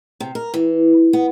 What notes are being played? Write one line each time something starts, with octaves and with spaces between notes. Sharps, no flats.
C3
A#4
E3
B3